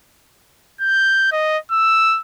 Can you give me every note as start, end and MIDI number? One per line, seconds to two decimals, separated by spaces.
0.81 1.29 91
1.32 1.58 75
1.71 2.21 88